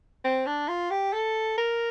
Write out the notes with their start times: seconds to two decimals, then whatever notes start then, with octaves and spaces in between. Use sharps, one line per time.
0.24 C4
0.46 D4
0.68 F4
0.90 G4
1.13 A4
1.58 A#4